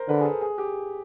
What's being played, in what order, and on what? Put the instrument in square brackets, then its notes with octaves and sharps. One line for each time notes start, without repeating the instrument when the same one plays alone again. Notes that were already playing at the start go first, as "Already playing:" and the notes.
Already playing: [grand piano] A#4 C5
[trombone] D3 [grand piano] B4
[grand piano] G#4
A4
G#4
G4